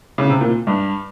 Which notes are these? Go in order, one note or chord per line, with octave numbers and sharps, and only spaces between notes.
C#3
C3
A#2
G2